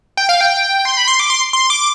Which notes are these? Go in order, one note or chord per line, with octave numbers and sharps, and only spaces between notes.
G5
F5
G5
C6
B5
C6
D6
C6
C6
D6